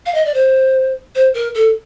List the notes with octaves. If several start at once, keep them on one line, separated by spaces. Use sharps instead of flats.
F5
D#5
D5
C5
C5
A#4
A4